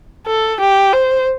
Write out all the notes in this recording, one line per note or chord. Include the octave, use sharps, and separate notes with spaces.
A4
G4
C5